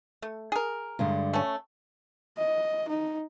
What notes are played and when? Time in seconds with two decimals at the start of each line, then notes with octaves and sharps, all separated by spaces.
0.22 A3
0.52 G#4 A#4
0.99 G2 D3 G#3
1.33 A3 C#4
2.38 D#5
2.89 D#4